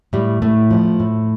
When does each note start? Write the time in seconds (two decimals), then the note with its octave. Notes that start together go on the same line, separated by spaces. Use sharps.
0.13 A2 G3
0.42 A2 A3
0.71 F3
1.00 A2